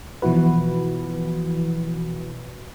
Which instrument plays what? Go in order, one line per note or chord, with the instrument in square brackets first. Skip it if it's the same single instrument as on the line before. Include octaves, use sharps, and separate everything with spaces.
[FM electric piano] B2 E3 F3 E4 F#4 B4